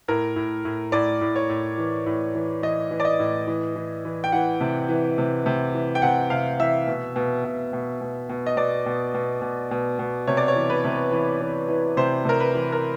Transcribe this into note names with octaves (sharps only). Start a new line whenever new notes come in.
A2 A#4
A2
A2
A2 D5
A2
C#5
A2
E3
A2
E3
E3 D#5
E3
D5
D#5
A2
E3
E3
E3
G5
E3 F#5
C3
E3
C3
C3
E3
G5
C3 F#5
C3 F5
E3 E5
B2
B2
B2
B2
B2
B2
D#5
B2 D5
B2
B2
B2
B2
B2
C3 C#5
D5
C#5
E3
B4
C3
E3
E3
E3
C3 C5
C3 A#4
B4
E3
A#4